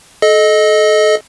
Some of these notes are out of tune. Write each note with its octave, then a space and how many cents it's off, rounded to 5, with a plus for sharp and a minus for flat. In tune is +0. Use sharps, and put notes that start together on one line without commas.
A4 -30 D#5 +0